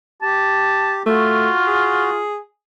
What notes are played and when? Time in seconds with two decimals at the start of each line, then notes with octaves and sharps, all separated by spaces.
0.22 G4 A5
1.06 A3 F4 F#4
1.67 G#4